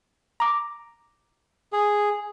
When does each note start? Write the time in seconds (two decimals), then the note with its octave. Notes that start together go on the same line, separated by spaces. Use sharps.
0.40 A#5 D6
1.73 G#4